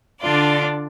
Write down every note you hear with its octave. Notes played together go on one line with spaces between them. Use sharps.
D3 D4 F4 D5